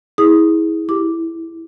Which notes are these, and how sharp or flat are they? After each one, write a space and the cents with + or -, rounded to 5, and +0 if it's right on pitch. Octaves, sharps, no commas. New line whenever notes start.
E4 -30 G#4 +0 D#6 +0
E4 +0 G4 +0 D6 +0